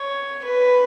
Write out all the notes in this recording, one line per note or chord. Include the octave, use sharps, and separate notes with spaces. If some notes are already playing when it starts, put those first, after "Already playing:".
Already playing: C#5
B4